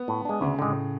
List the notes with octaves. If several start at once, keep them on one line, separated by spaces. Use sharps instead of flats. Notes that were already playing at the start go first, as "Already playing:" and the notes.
Already playing: B3
A2
G#3 D4
D2 C#3
A2 D3 G#3